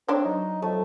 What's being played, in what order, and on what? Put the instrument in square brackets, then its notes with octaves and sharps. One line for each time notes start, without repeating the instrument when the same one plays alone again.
[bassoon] C4 [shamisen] D4 C#5
[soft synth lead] F#3 [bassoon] D#4
[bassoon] F2 [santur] A3